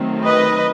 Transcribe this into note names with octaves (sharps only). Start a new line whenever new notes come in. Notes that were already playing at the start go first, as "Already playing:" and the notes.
Already playing: D#3 F#3 A3 C4
B4 D#5